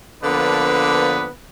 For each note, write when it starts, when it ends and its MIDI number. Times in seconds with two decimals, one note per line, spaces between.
0.23 1.28 50
0.23 1.28 53
0.23 1.28 58
0.23 1.28 59
0.23 1.28 62
0.23 1.28 71